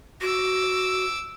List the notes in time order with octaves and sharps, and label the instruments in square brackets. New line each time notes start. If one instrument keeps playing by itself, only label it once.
[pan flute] F#4 [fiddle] D6 E6